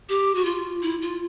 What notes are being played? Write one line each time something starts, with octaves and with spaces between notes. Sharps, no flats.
G4
F#4
F4
E4
F4